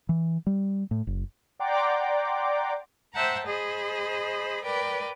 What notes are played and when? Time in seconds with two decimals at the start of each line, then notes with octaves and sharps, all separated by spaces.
0.09 E3
0.47 G3
0.91 A2
1.07 F#1
1.59 D5 F#5 G5 A#5 C6 D6
3.13 C5 E5 F#5 G5 A5 A#5
3.46 G#4 C5 D#5 B5
4.64 A#4 B4 D5 G5